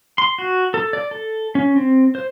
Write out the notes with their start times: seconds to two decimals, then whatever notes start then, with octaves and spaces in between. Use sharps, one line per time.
0.18 C6
0.38 F#4
0.74 A4
0.93 D5
1.11 A4
1.55 C#4
1.76 C4
2.15 C5